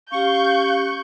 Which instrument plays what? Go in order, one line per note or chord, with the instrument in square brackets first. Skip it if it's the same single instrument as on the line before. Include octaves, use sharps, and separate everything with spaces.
[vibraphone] C#4 G4 [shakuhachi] F5 [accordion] C#6 [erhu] G6